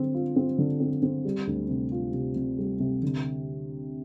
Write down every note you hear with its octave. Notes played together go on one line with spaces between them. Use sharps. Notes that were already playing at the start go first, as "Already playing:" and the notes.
Already playing: D3 C4
F4
C4
D3
C4
C4
G3
D2
C3
F4
C3
C3
G3
C3
D3